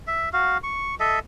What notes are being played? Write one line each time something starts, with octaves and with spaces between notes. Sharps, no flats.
E5
F#4 F5
C#6
A4 D#5 E5